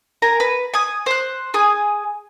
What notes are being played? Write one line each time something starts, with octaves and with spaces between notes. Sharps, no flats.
A#4 G#5 A#5
B4
G#5 D#6
C5 F#6
G#4 G#5 D#6